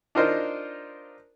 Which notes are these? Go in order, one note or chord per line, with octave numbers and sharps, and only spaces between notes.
D4 D#4 F4 A#4 C5 D#5